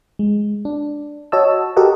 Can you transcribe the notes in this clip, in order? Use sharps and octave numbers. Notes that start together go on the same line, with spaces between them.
G#3
D4
F#4 C#5 D#5 A5 E6
F#4 G4 A4 A#4 D#5 F#5